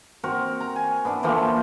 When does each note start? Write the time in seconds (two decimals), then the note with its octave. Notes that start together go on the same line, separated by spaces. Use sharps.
0.24 C4 F#4 A#4
0.60 A#5
0.76 G#5
1.05 B3 D4 E4
1.23 E3 F3 A3 A#3